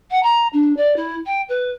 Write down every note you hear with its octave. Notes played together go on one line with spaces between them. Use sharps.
F#5
A#5
D4
D5
E4
G5
B4